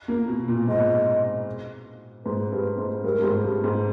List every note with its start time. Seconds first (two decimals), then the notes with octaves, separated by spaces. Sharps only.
0.08 A#3
0.28 B2
0.48 A#2
0.67 G#2 D#5
2.25 G#2 B4
2.52 G2
2.78 G#2
3.04 G2 A#4
3.19 G2
3.23 G#2
3.44 G2
3.64 G#2